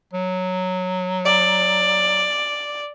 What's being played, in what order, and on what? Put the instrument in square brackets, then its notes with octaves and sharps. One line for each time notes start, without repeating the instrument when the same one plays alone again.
[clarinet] F#3
[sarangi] D5